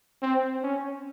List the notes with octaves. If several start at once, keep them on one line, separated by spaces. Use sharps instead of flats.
C4
C#4